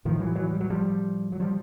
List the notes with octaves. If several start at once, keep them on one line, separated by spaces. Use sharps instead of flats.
A2 D#3 F3
E3 F#3
E3 F#3
G3
F#3
F3 G3
F#3
F3 G3